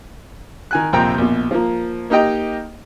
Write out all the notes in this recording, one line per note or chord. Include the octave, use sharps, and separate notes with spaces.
D#3 G#5 F#6
A#1 F2 C3 G5 A#5
A#1 B2
F3 A#3
A#3 D#4 G4 D#5 G5 A#5